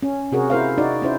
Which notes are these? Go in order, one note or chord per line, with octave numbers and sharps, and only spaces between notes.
C#4
C3 F#4 G#4 A#4
E4 A#4 C5 F5
D#4 F#4 D5
C#4 E4 C5